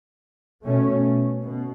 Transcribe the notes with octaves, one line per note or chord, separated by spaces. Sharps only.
B2 A3 C#4
B2